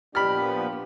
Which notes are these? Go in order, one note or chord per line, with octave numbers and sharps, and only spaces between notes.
A#2 F3 B3 D4 G4 B5 F6